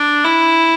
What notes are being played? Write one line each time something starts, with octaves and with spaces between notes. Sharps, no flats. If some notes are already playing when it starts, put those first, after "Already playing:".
Already playing: D4
E4